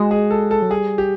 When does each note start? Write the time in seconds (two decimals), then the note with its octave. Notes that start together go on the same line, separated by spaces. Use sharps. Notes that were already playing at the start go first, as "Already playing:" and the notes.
Already playing: G#3 F#4
0.11 G#4
0.31 A4
0.51 A4
0.62 F#3
0.71 G3 G#4
0.98 G4